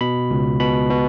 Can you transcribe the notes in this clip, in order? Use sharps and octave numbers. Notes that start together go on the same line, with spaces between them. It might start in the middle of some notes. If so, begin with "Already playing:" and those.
B2 B5
C#2
B2 B5
B2